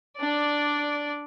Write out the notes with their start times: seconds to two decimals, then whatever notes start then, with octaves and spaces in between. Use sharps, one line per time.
0.17 D4 D5